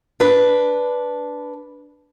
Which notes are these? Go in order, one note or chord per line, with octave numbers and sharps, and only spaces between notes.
D4 B4